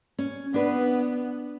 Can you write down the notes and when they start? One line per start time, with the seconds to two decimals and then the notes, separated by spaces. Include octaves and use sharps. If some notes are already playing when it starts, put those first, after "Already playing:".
0.19 C#4
0.54 B3 D4 B4